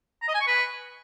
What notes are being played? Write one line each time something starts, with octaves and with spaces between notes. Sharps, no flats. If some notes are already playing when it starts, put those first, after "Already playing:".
A#5
D#5
G#5
C#6
B4